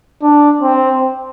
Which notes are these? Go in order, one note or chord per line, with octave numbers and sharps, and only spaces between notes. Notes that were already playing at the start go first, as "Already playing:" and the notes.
D4
C4